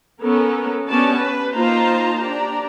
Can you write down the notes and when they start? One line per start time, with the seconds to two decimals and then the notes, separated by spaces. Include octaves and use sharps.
0.22 B3 C#4 A4 A#4
0.88 B3 C#4 D4 G4 D5 A5
1.18 B4
1.55 A#3 D#4 F4 C5 A5 A#5
2.20 D4 G4 A#5